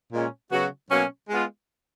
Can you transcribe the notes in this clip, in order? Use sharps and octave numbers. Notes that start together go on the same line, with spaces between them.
A#2 G#3 C#4
C#3 F#3 B3 F#4
B2 F#3 A#3 C#4
G#3 B3 F4